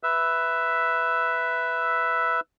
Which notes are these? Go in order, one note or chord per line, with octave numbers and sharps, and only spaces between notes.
B4 E5 E6